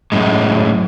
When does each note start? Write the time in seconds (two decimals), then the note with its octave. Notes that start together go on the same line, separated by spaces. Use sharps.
0.12 F#2 A2 G#3